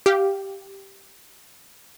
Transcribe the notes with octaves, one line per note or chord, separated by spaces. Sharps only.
G4 F5